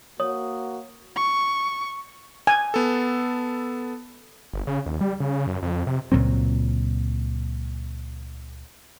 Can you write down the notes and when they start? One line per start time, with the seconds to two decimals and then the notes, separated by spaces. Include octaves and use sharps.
0.20 A#3 F#4 C#5 D#6
1.16 C#6
2.47 G#5
2.74 B3 A4
4.53 G1
4.67 C#3
4.86 D#2
5.01 G3
5.20 C#3
5.47 F#2
5.63 F2
5.87 C3
6.12 C#2 A#2 F#3 C4